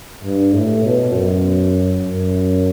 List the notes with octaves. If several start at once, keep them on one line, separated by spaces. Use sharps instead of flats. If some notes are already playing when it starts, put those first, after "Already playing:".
G2
A2
B2
F#2
F#2